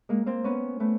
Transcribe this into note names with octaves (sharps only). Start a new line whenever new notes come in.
G#3 A#3
A#3 C4
B3 C#4
A3 B3